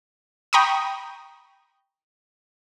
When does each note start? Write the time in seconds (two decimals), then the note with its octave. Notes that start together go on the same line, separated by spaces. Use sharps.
0.53 G5 A#5 B5 C#6 D#6